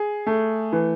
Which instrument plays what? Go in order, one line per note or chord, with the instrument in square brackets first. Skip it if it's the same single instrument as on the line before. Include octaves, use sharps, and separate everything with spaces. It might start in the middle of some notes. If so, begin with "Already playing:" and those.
Already playing: [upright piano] G#4
A3
E3